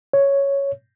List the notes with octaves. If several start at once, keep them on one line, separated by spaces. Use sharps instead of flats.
C#5